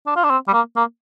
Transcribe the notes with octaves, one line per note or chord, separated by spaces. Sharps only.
D4
F4
D4
C4
G3
A#3
A#3